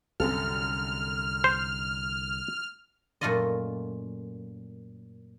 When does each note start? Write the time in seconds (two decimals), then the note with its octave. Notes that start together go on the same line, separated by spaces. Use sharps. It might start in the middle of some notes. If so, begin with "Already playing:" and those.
0.20 C2 F#2 D3 C4 A4 F6
1.44 C5
3.21 F#2 A#2 A3 F4 D5 D#5